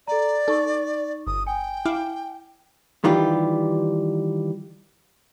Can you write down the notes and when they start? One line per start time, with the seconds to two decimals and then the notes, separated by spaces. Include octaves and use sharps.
0.08 A4 D5 A#5
0.48 D#4 A4 C#6
1.27 G1 D#6
1.47 G5 G#5
1.85 E4 F5 D6
3.04 D#3 E3 G3 F4 G4